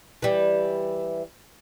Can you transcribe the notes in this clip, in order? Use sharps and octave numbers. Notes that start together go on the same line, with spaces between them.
E3 G3